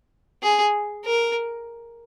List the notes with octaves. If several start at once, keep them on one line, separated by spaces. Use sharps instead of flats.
G#4
A#4